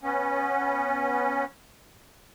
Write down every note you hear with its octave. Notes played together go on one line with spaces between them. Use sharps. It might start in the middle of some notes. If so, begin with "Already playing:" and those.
B3 C#4